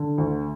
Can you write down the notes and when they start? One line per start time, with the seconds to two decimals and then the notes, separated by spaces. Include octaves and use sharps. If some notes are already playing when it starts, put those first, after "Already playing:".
Already playing: D3
0.18 D2